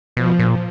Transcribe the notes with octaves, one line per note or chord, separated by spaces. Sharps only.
B2 F3
A#2